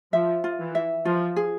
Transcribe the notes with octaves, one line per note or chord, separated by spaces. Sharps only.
F3 E5
F4
E3
E5
F3 F4
G#4